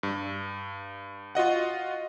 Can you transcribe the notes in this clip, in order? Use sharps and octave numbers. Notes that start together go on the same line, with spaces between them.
G2
F4 F#4 D#5 F#5